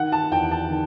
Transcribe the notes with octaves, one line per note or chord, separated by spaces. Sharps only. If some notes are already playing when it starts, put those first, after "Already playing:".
Already playing: D#3 F#5
A5
E2 G5
A5
D#3